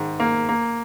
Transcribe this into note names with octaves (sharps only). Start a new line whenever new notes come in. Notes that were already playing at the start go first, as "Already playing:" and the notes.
Already playing: G#2 D#3
A#3
A#3